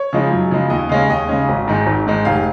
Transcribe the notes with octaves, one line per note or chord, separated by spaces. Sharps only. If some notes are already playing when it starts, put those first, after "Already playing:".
Already playing: C#5
C#3 F3 G#3 D#4
F#2
C#3 F3 G#3 D#4
D#2 D#5
C#3 G#3 C#4 F5
D#2 D#5
C#3 G#3 C#4
G#1
G#2 D#3 G#3
G#1
G#2 D#3 G#3
F1 F5